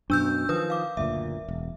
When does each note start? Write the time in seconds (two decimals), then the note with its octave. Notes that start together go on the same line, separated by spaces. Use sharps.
0.10 F#2 B2 D4 E6 G6
0.49 D#3 F3 B4 D#6
0.70 F5 D6
0.97 F#1 D2 A#2 E5
1.48 E1